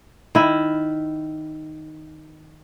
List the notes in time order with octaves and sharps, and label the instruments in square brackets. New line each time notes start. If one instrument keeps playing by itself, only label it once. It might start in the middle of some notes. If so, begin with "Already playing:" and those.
[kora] D#3 E4